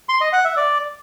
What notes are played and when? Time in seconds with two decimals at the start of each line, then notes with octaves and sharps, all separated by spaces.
0.09 C6
0.21 D#5
0.33 F#5
0.45 E5
0.57 D5